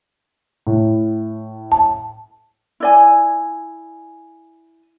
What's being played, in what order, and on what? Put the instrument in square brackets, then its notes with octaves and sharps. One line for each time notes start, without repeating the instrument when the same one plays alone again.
[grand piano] A2
[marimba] A5
[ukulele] E4 D5 G#5